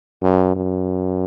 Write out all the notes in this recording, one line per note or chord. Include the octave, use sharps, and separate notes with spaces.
F#2
F#2